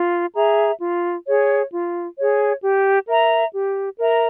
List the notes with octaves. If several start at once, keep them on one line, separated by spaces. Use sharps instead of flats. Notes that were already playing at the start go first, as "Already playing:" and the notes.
Already playing: F4
G#4 E5 A#5
F4
G#4 C#5
F4
G#4 C#5
G4
A#4 E5 A#5
G4
A#4 E5 A#5